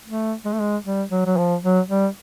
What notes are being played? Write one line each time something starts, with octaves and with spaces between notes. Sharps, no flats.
A3
G#3
A3
G#3
G3
F#3
F#3
F3
F#3
G3